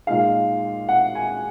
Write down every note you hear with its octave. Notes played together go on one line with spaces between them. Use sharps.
A#2 G#3 D#4 F5
F#5
G#5